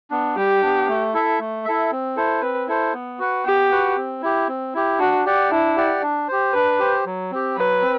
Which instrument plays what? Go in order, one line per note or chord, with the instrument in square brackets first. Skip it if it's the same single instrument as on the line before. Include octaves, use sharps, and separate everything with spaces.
[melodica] B3 D4
[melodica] G3 [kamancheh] G4
[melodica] B3 D4
A3
E4 A4 E5
A3
E4 A4 E5
C4
E4 A4 C5
[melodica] C4 [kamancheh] B4
[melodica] E4 A4 C5
B3
F#4 B4 F#5
[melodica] B3 [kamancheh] G4
[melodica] F#4 B4 F#5
C4
E4 G4
C4
E4 G4
[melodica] D4 [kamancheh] F#4
[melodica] G4 D5 F#5
[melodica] D4 [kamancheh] E4
[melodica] G4 D5 F#5
D4
G4 C5
[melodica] D4 [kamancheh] B4
[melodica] G4 C5
F#3
C4 G4
[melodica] F#3 [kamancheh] B4
[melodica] C4